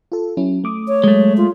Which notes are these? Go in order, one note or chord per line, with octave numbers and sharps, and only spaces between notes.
F4 A4
F#3 C#4 E4
A3 D6 D#6
C#5
F#3 G#3 A3
F4